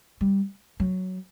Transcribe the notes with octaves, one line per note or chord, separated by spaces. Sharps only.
G3
F#3